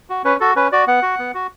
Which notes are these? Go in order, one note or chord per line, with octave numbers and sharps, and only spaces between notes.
F#4
C#4 B4
F#4 A4
C#4 B4
F#4 D5
B3 F#5
F#4
B3
F#4